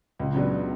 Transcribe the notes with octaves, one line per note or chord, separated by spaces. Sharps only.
C#2
C#3 F#3 B3 D4